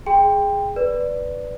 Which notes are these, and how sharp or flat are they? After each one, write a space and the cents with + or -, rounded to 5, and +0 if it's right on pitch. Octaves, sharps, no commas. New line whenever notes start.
G#4 +0 G5 +15 C6 -15
B4 +0 D5 +0